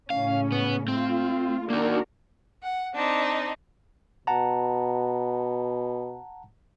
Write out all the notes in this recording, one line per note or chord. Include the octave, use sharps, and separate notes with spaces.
A2 C#3 C#4 F5
B3
A3 C4 F4
A#3 D4 D#4 F#4 A#4
F#5
C4 D4 D#4
B2 F#5 A5 A#5